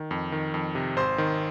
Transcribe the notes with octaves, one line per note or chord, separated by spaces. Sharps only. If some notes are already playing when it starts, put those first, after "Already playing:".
Already playing: D#3
F2
D#3
F2
C3
G#1 C5 C6
D#3